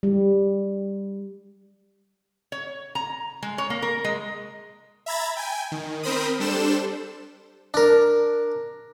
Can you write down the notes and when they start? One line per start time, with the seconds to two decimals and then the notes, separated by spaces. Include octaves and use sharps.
0.03 G3
2.52 C#5
2.95 A#5
3.43 G#3
3.58 C#5
3.70 A#3
3.82 A#4
4.04 G#3
5.06 E5 A#5 B5 G#6 A6
5.36 G5 G#5
5.72 D#3
6.03 C4 A#4 C5 B5 D#6
6.40 G3 D4 A4 C5 E7
7.74 D4 A#4